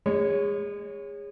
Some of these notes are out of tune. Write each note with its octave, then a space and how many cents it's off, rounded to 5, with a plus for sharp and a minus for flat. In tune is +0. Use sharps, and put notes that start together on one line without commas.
G#3 -30 C#5 +0